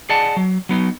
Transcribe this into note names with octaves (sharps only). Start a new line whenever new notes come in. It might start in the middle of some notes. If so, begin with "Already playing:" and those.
G#4 D5 D#5 F#5 A5
F#3
F#3 B3 D#4